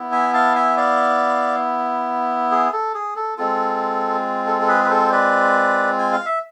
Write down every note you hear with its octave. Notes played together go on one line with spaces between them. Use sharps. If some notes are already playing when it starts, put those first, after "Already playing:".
Already playing: B3 E4
E5 G#5
F5 A5
E5 G#5
D5 F5
G#4
A4
G#4
A4
G#3 C4 F4 A4
A4
A4
G#4 B4
B4
A4 C5
B4 D5
G#5
F5
E5